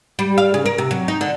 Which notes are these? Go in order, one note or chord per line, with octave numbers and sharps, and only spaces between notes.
G3
F5
C#3
A#4
C3
F#3
D#4
D3